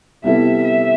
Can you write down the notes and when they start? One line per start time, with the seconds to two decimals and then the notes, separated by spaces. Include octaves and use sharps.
0.24 C3 G3 B3 E4 A4 E5
0.64 E5